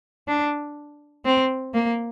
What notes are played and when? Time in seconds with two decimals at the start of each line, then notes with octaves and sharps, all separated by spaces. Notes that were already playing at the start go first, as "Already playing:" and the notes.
0.28 D4
1.25 C4
1.74 A#3